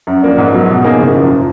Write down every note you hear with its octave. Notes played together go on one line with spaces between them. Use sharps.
F#2
F3 A#3 D4
G#2
F#3 B3
B2
A#3 D#4 G#4
F#1
F#2 F3